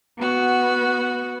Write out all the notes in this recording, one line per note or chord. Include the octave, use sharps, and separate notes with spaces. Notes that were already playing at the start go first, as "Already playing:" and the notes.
B3 F#4